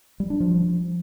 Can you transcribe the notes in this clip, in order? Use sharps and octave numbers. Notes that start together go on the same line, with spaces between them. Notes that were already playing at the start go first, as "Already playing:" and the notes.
G3
D4
F3